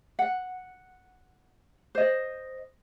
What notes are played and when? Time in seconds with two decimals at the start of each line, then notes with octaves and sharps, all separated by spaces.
0.19 F#5
1.95 C5 D#5